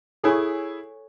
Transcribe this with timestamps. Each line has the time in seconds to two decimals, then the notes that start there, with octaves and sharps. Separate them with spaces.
0.24 E4 G#4 A4 C#5 G#5 C#6